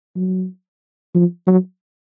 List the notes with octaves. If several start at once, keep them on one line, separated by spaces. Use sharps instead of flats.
F#3
F3
F#3